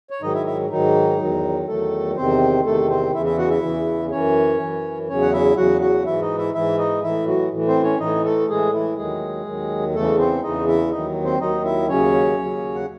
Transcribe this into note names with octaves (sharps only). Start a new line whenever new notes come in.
C#5
G#2 D#3 F#3 D#4 D#5
E4 E5
E4 E5
G#2 D#3 F#3 D#4
E2 D#3 F#3
E2 D#3 F#3 A3 A4
E2 C3 D#3 C4 C5
E2 C3 D#3 A3 A4
C4 C5
E2 C#3 E3 E4 E5
E4 E5
F#4 F#5
E4 E5
E2 C#3 E3
F#2 E3 C#4 C#5
F#2 E3
E2 C#3 F#3 C#4 C#5
F#5
E4 E5
E2 C#3 F#3 F#4 F#5
F#4 F#5
G#2 E3 E4 E5
D#4 D#5
E4 E5
G#2 E3 E4 E5
D#4 D#5
A2 E3 E4 E5
F#3 F#4
A2 E3
C4 C5
C#4 C#5
A2 E3 D#4 D#5
A3 A4
A2 E3 G#3 G#4
E3 E4
D#2 D#3 F#3 G#3 G#4
D#2 D#3 F#3
E2 C#3 E3 A3 A4
C4 C5
E2 C#3 E3 D#4 D#5
E4 E5
D#2 D#3 F#3 D#4 D#5
C4 C5
D#2 D#3 F#3 D#4 D#5
E4 E5
D#2 C#3 F#3 C#4 C#5
D#2 C#3 F#3
F#5